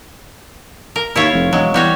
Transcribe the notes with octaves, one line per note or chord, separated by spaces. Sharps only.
A#4
D#2 E4 F4 C#5
F1
E1 F#3 G#3
E2 G3 F#4 C#5